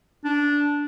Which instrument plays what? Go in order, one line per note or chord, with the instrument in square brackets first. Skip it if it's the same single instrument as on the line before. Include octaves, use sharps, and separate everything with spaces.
[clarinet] D4